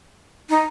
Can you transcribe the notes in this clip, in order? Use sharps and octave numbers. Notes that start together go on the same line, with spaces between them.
D#4